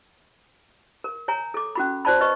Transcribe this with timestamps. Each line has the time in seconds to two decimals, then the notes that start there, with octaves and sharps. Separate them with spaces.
1.04 A#4
1.28 C#5 G#5 A#5
1.54 A4 D6
1.75 C#4 F#4 B5
2.05 F#4 C5 D5 A5 B5
2.21 B4 D#5 C#6